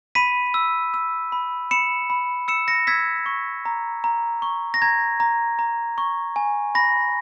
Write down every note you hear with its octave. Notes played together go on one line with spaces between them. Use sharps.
B5 B6 D#7
E6
E6
B5
B5 C#7 E7
B5
E6 C#7 E7
A#6 C#7
E6 G#6 B6
C#6
A#5
A#5
C#6
A#6
A#5 G#6
A#5
A#5
C#6
G#5
B5 A#6